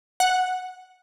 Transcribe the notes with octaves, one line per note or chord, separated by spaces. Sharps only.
F#5